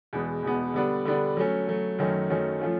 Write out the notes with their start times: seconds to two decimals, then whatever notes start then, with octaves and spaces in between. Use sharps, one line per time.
0.13 E2 B2 G#3 B3
0.43 E2 B2 G#3 B3
0.74 D3 G3 B3 D4
1.05 D3 G3 B3 D4
1.37 F#3 A3 C#4
1.67 F#3 A3 C#4
1.99 F#2 D#3 F#3 A3 C#4
2.30 F#2 D#3 F#3 A3 C#4
2.61 F3 A3 C#4 F4